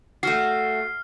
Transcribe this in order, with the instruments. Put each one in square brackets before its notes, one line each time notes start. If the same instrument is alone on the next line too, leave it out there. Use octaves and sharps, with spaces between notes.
[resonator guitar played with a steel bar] A3 F#4 [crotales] F6 C7